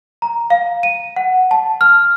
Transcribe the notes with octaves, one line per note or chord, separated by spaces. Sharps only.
A#5
F5
D#7
F#5
A5
F6